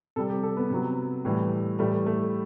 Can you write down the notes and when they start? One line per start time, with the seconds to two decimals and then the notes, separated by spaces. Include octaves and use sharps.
0.16 C3 G3 A4
0.30 G4
0.43 A4
0.57 B3
0.70 C3 F#3
1.25 A2 E3 G3
1.79 A2 E3 G3 A3
2.06 A3